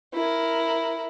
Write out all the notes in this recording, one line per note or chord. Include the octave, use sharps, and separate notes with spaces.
E4 A#4